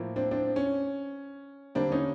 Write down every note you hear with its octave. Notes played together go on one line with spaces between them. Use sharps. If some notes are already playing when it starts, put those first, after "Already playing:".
Already playing: A2 F3 A#3
C4 D4
C4 D4
C#4
D3 G3 A#3 C4 D4
C#4 D#4